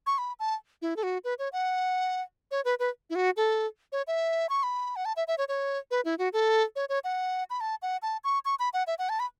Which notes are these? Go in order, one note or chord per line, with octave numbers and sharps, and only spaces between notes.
C#6
B5
A5
E4
A4
F#4
B4
C#5
F#5
C#5
B4
B4
E4
F#4
A4
C#5
E5
C#6
B5
F#5
A5
E5
E5
C#5
C#5
B4
E4
F#4
A4
C#5
C#5
F#5
B5
A5
F#5
A5
C#6
C#6
B5
F#5
E5
F#5
A5
B5